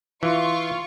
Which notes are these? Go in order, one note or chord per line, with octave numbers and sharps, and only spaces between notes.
E3 F4 C#6